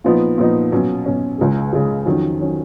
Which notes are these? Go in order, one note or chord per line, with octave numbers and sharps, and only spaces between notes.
A#2 F3 B3 D#4
A#2 F3 B3 D#4
B2 F#3 C#4
B2 F#3 C#4
C#2 C#3 G#3
C#2 C#3 G#3
F2 D#3 F#3 C#4
D#3 F#3 C#4